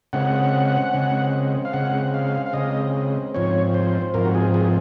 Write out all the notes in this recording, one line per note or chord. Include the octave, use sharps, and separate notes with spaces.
C#3 G#3 C4 F#5
C#3 G#3 C4
F5
C#3 G#3 C4 F#5
F5
F5
C#3 G#3 C4 D#5
G#2 F3 C4 C#5
C5
G#2 F3 C4 A#4
F#4
G#4
G#4